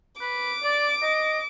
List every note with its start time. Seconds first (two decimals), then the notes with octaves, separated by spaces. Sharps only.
0.21 B4 D6
0.63 D5
1.02 D#5